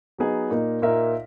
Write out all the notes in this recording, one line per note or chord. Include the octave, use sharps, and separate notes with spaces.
F#3 B3 D#4 G#4
A#2 A#3 D#4
A#2 A#3 D#4 A#4 E5